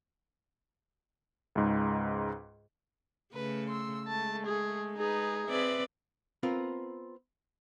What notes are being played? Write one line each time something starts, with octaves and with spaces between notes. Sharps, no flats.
C#2 G#2
C#3 A3 B4
C6 E6
G#3 A3 A5
G#4
D#4 G#4 B4
C4 B4 D5 E5
B3 C4 F4 A#4